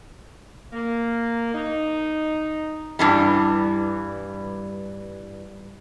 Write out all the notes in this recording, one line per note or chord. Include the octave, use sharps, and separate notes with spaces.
A#3
D#4
G2 E3 G3